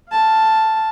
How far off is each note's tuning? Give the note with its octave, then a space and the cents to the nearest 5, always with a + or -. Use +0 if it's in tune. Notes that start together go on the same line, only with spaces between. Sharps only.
F5 +0 A5 +0